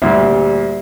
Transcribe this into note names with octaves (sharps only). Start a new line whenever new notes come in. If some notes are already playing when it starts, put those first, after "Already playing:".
D2 A#2 G3 E5